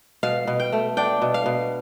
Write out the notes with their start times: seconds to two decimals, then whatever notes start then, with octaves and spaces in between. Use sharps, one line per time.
0.23 B2 F5
0.47 B2
0.60 G5
0.73 A3
0.97 D4 G5
1.22 B2
1.34 F5
1.46 B2